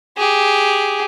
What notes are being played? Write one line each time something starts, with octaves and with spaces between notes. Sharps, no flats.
G4 G#4